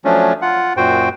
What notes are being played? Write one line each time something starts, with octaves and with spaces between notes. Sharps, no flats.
F3 F#3 A3 C#4 D4
F4 F#5
F#2 A#2 F#4 C5 G5